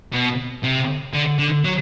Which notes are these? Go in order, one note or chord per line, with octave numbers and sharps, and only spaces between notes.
B2
C3
D3
D3
F#3